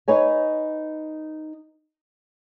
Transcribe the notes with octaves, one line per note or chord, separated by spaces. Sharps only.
D#4 B4 C#5 G#5